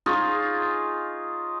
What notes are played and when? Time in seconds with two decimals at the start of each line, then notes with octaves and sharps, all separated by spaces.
0.06 D#4 F4 G#4 C#5